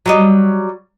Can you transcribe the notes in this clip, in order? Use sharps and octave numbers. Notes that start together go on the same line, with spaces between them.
F#3 G3 D#5